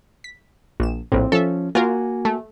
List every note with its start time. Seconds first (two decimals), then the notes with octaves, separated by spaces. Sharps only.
0.24 B6
0.80 A#1 E7
1.12 A#1 A2 C4
1.32 F3 C#4 A4 E5
1.75 A#3 F4 F#4 A#4 G#5
2.25 A3